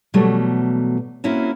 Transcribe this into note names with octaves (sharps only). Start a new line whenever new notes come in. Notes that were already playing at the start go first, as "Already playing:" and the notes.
B2 E3 F#3 G3 A3
A#3 C4 C#4 E4 F#4